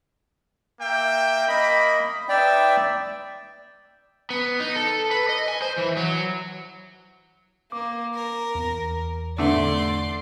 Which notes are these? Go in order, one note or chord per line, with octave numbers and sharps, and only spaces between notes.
A#3 E5 G5
A#3 D#5 B5
D#4 B4 D5 E5 G5
B3
D#4
A4
B4
D#5
G#5
C5
E3
F#3
A#3 D6
A#4
E2
D3 A3 D5 C6